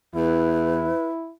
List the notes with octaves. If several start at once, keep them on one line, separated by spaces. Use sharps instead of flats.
E2 E4 B4